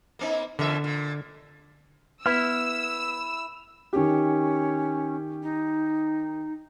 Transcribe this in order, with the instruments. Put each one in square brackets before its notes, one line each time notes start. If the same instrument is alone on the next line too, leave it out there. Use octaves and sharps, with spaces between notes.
[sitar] A#3 B3 D#4
[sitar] E2 A#4 E5 [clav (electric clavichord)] D3
[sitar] A#2
[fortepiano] B3 [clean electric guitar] E4 [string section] E6 [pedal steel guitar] F6
[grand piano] D#3 G4 [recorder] C#4
[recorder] D#4